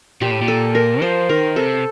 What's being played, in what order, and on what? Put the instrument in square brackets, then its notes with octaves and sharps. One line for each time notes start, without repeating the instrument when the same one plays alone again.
[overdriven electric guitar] A#2 [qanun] G4
[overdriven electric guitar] A2
A#2
[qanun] A4
A#4
[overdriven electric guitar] F3 [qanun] C5
[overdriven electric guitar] D#3 [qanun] A#4
[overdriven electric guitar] C3 [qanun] A4